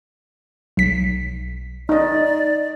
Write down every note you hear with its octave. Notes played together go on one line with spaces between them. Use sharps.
B1 B6
D#4 D5 D#5